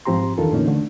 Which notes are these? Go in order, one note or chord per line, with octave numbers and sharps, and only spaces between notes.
G#2 F3 C4 G4 A#5 C6
E2 D#3 D4 F4 A4 A#4
A2 D3 E3 A#3 C#4 D#4
D3 A3